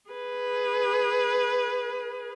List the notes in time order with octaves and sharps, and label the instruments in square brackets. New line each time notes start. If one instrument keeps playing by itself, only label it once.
[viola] G#4 B4